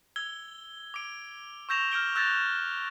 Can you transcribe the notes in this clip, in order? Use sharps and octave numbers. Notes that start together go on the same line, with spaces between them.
E6 G#6 G7
D6 D7
C#6 E6 G6 A#6 E7 F7
F6 G6 D7 G7
E6 F#6 G6 A6 A#6